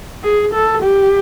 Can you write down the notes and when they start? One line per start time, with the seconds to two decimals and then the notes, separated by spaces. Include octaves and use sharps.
0.24 G#4
0.54 A4
0.83 G4